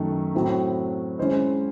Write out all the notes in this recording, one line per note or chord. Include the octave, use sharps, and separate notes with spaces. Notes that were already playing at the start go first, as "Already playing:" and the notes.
Already playing: F#2 D#3 A3 D#4 A4
A2 F#3 C4 E4
G#3 C#4 E4 C5 D#5